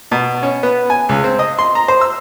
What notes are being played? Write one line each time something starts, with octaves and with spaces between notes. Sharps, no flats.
B2
C#4
B3
G#5
C#2
C4
D#5
C6
A#5
C5
E6